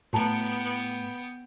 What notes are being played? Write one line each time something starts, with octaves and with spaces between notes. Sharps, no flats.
A2 B3 F#4 G5 A5 A#5